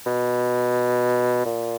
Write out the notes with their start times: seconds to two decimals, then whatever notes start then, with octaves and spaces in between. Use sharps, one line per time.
0.06 B2
1.45 A#2